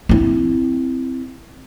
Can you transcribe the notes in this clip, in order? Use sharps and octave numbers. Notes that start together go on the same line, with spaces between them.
C4 E4